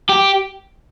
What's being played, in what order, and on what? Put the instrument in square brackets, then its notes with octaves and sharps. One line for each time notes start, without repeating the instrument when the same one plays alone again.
[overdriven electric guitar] G4